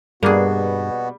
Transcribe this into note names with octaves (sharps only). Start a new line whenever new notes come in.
G2 B2 G3 A#3 B3 D4 F#4 G#4